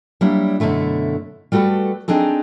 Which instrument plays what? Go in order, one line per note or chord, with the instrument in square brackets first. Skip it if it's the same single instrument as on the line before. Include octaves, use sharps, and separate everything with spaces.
[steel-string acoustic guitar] F#3 G3 A#3 D4 E4
F#2 B2 D3 A3 E4
G3 A3 F#4 A4 B4
C4 D4 D#4 G#4 A4